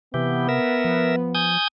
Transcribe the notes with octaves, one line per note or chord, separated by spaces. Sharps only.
C3 E3 B3 G4
A#4 E5
F3
G#5 D#6 G6